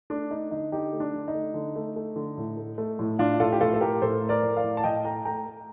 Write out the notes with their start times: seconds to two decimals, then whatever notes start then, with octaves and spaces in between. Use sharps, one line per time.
0.10 A3 D4
0.30 A3 D#4
0.51 D3 D#4
0.72 D3 D#4 G4
0.93 A3
1.00 D4
1.13 D3
1.28 D#4
1.35 A3
1.54 D3
1.76 A3
1.96 A3
2.16 D3
2.37 A2
2.57 A3
2.78 A3
2.99 A2
3.19 A2 D4 F4
3.40 A2 F4 A4
3.52 G4
3.61 A2 F4 A4
3.74 A4
3.81 A2 G4 A#4
4.02 A2 A4 C5
4.22 A3
4.29 A#4 D5
4.43 A2
4.57 D5 F5
4.63 A2
4.77 A5
4.84 A2 D#5 G5
5.04 A3 G5 A#5
5.25 A3 G5 A#5
5.46 A3